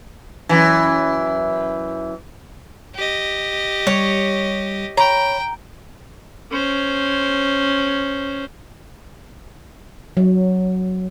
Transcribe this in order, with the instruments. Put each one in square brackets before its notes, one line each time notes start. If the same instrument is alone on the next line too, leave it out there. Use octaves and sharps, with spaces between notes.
[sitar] F#2 A#2 E3
[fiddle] G4 D#5
[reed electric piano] G3 [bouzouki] C#5
[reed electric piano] C#5 B5 [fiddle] G5 [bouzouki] A#5
[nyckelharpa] C#4 C5
[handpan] F#3